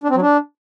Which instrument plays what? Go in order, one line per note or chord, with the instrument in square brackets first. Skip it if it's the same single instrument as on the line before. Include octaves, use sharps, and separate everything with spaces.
[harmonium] D4
C4
F#3
D4